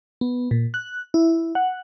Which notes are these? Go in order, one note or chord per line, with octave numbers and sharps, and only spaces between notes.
B3
A#2
F#6
E4
F#5